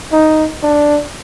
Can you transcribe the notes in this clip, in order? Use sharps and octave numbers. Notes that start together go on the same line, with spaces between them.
D#4
D4